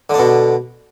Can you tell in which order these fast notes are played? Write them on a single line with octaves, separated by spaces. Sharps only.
D3 D4 B2